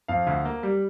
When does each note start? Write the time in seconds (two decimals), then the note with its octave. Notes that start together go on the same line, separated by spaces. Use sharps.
0.08 F2 F5
0.27 D2
0.45 A#3
0.63 G3